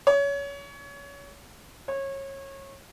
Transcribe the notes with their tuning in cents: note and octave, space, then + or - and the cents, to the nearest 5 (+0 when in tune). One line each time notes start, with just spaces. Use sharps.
C#5 +25
C#5 -25